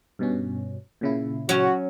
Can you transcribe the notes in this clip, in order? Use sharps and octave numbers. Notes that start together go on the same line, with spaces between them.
G2 B2 C#4
A#2 C#3 E4
F#3 C#4 F#4